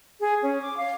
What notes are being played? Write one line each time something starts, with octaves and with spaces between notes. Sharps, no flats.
G#4
C#4
D6
F5